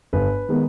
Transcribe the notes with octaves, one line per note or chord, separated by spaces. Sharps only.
G1 B4
D#3 G#3 B3